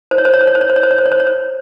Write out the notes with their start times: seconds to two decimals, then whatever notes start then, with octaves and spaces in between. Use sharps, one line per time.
0.11 C5
0.18 C#5
0.25 C5
0.34 C#5
0.41 C5
0.48 C#5
0.55 C5
0.61 C#5
0.70 C5
0.76 C#5
0.83 C5
0.91 C#5
0.98 C5
1.06 C#5
1.12 C5
1.20 C#5
1.27 C5